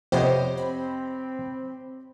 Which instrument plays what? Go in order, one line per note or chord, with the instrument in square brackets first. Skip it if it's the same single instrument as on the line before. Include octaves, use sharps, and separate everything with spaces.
[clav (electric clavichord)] F2 C3 B3 [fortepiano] G4 C#5 D#5 [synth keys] C5
[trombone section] C4 [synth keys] B5